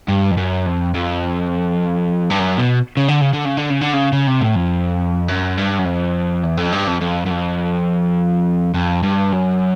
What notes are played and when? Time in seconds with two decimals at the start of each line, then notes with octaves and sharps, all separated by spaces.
0.08 G2
0.31 F2
0.37 F#2
0.66 F2
0.94 F2
2.30 G2
2.39 F#2
2.58 B2
2.97 C#3
3.08 D3
3.21 C#3
3.33 D3
3.45 C#3
3.57 D3
3.70 C#3
3.81 D3
3.93 C#3
4.13 C#3
4.27 C3
4.41 A2
4.55 F2
5.28 F#2
5.57 G2
5.79 F#2
5.85 F2
6.43 E2
6.57 F2
6.72 G2
6.87 F2
7.01 F2
7.26 F#2
7.30 F2
8.74 F2
9.03 G2
9.32 F#2